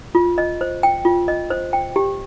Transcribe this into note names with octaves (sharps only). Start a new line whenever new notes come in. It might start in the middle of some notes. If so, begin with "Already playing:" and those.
F4
D#5
C5
G5
F4
D#5
C5
G5
G4